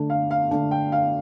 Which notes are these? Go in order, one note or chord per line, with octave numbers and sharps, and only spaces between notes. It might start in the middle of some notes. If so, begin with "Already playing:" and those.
Already playing: D3 A3 D4
F5
F5
D3 A3 D4
G5
F5